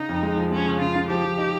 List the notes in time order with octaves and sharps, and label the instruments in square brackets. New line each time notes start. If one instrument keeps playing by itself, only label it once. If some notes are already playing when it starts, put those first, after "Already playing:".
Already playing: [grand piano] C#3 [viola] D#4
[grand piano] F2
G#3
F3
[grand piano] G#3 [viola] C#4
[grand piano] C#3
[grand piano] C#3 [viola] F4
[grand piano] C#3
[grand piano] F3 [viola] G4
[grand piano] F3
D#4